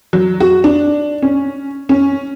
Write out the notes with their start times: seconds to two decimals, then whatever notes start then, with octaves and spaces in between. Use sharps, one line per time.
0.13 F#3
0.40 F#4
0.64 D4
1.22 C#4
1.89 C#4